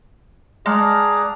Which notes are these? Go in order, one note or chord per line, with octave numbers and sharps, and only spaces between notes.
G#3 G#4 D5 F5 F#5 A5 A#5